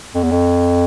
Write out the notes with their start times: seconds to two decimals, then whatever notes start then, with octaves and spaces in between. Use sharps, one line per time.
0.15 F2
0.23 E2
0.31 F2